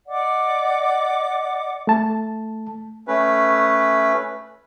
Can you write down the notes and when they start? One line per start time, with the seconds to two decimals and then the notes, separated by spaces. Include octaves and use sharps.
0.07 D5 D#5 F#5 D6
1.87 A3 A5
3.08 A3 C#4 B4